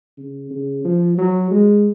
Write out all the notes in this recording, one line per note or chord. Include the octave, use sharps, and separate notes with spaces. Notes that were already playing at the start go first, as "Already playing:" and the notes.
C#3
C#3
F3
F#3
G#3